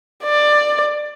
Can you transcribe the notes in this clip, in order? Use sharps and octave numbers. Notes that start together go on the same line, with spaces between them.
D5